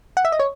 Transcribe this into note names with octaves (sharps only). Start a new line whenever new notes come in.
F#5
E5
D#5
C#5